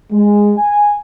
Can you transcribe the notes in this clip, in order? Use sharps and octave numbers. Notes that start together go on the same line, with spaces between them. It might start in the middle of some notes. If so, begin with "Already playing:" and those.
G#3
G#5